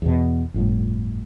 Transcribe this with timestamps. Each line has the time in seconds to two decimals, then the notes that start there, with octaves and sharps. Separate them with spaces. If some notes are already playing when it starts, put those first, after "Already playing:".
0.02 E2 B2
0.54 G1 F2 A2